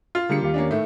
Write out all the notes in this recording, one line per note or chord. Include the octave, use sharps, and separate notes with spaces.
F4
D3 G3 A#3 G#4 C#7
D#2 G4 F5
A#3 C#4 D4
A2 D#3 A3